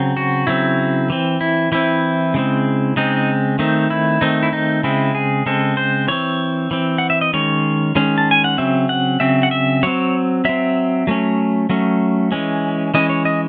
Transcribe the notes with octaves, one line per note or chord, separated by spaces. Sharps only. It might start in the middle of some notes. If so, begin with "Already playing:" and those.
Already playing: C#3 F#3 C4
F#4
C#3 F#3 C4 E4
E3 C4
E4
E3 C4 E4
C#3 G#3 C4
C#3 G#3 C4 D#4
D#3 A3 C4 D#4
E4
D#3 A3 C4 D#4
E4
D#4
C#3 G#3 C4 E4
G#4
C#3 G#3 C4 A4
C5
E3 C4 C#5
E3 C4
F#5
E5
D#5
D#3 G#3 C#4 C#5
D#3 G#3 C#4
A5
G#5
F#5
C#3 F#3 C4 E5
F#5
C#3 F#3 C4 E5
F#5
E5
F#3 C4 C#5
F#3 C4 E5
F#3 A3 C#4
F#3 A3 C#4
E3 G#3 C#4
E3 G#3 C#4 D#5
C#5
D#5